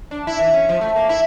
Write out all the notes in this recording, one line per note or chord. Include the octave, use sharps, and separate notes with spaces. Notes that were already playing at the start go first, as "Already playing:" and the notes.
D4
E4
E3
C#4
F3
A3
A#3
E4